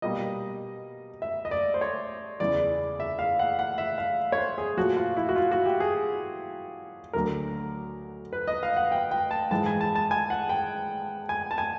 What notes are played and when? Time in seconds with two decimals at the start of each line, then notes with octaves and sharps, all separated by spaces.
0.02 B2 G3 A#3 D#5
1.22 E5
1.45 D#5
1.51 D5
1.74 C5
1.81 C#5
2.40 E2 C#3 E3 D5
2.60 D5
3.00 E5
3.19 F5
3.39 F#5
3.59 F#5
3.78 E5
3.98 F5
4.32 C#5
4.38 C5
4.58 G#4
4.77 A#2 F3 A3 F#4
4.96 F4
5.17 E4
5.29 F#4
5.36 F4
5.51 F#4
5.66 G4
5.80 G#4
7.13 D2 D3 F#3 A#4
8.33 B4
8.48 D#5
8.63 F5
8.76 F#5
8.92 G5
9.11 G5
9.31 A5
9.51 G#2 E3 G#3 A5
9.66 G#5
9.81 A5
9.95 A5
10.11 G#5
10.30 F#5
10.49 G5
11.29 G#5
11.51 A5
11.58 G#5